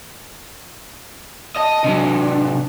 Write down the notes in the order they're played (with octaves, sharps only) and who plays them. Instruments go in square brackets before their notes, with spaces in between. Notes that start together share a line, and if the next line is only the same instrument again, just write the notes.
[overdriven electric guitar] D#5 [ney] A5
[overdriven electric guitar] C3 F#3 [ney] D4